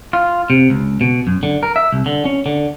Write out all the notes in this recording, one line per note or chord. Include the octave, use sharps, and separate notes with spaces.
F4
C3
C#2
B2
F#2
D3
A#4
E5
C2
D3
C#4
D3